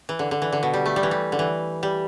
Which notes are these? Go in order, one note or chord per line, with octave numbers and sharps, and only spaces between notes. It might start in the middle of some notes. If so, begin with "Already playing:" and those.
E3
D3
D3
E3
D3
B2
G3
A3
G3
E3
G3
D3
E3
G3